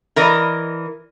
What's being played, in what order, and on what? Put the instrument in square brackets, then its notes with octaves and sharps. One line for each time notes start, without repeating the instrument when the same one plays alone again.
[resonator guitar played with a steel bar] E3 A#4 D5 D#5